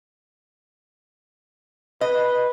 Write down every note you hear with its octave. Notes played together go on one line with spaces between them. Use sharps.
B4 D#5